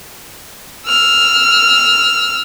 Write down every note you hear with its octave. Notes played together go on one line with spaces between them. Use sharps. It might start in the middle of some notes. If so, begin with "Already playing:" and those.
E6 F6